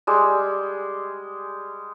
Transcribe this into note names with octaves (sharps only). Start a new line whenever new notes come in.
G3 G#3